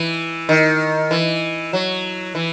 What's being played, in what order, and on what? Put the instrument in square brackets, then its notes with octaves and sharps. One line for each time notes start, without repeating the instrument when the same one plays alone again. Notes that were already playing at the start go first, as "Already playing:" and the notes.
Already playing: [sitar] E3
D#3
E3
F#3
E3